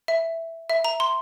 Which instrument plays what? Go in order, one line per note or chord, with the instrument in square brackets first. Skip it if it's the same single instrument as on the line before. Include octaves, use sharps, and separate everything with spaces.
[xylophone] E5
E5
A#5
C6